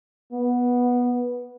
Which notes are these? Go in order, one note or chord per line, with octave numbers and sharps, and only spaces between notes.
B3